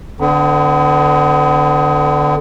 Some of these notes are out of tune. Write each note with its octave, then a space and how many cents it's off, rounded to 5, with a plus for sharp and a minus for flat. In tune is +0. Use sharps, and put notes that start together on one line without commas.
D3 +0 B3 +40